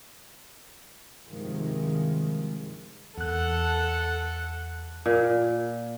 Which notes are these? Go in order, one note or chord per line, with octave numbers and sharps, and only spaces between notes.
G2 C3 D#3 F3 G#3
E2 A4 F#5 F#6
A#2